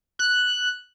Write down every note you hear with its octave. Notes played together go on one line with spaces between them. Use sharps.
F#6